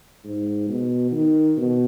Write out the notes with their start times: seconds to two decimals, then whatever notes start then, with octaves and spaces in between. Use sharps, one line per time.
0.24 G#2
0.69 B2
1.12 D#3
1.57 B2